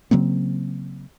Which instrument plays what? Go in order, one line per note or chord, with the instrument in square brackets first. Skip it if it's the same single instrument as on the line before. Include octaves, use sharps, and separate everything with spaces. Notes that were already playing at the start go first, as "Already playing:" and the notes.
[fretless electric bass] C#3 F#3 A#3 C4